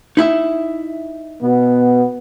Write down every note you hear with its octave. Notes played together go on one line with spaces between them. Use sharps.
D#4 E4 E5
B2 B3